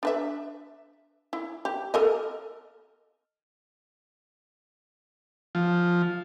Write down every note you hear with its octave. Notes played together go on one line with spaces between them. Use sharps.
D4 B4 E5
E4
G4
A4 A#4 D#5
F3